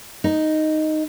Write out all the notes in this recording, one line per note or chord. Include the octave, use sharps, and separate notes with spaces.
D#4